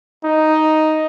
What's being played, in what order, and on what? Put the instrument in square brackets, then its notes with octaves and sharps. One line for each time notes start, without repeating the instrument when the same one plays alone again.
[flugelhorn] D#4